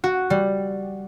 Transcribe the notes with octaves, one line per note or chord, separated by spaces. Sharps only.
F#4
G3